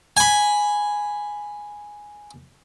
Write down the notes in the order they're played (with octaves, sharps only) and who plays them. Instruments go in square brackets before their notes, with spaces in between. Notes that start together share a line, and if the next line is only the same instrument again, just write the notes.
[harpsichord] G#5 B5